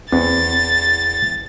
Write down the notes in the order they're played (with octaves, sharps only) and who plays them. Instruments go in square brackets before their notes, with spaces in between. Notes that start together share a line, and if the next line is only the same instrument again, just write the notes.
[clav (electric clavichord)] E2 [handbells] C4 [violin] A6